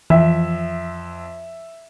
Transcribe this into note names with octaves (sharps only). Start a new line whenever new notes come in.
F2 E3 E5